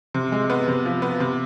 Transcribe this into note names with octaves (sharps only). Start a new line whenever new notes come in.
C3
G#3
B3
C3
F3
B3
C3